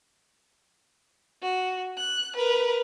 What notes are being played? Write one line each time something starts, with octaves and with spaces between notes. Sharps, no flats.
F#4
F#6
A#4 B4